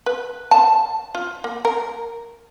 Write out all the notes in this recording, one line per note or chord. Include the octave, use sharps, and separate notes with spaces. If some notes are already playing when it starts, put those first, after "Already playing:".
B4
A5
F4
A#3
A#4